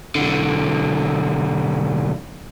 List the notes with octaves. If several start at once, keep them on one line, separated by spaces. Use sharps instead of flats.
B1 D3